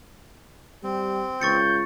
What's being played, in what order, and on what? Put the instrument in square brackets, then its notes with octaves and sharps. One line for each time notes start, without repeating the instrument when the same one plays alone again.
[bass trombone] G3 [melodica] C4
[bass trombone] C#2 [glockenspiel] C#6 A6 C#7 [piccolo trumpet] G6